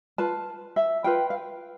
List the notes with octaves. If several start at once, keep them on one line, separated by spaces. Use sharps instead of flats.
F4 B4 A5
E5
F4 B4 G5
F5